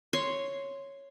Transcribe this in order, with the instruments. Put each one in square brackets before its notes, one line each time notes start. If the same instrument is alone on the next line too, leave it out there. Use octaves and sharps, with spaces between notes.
[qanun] C#5 C6